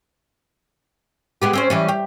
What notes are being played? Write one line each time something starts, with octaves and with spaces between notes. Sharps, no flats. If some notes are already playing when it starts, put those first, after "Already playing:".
G#3 B3 G4
C4 C#4 C5
E3 G3 C#4
G4